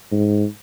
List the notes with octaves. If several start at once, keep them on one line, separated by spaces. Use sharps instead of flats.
G#2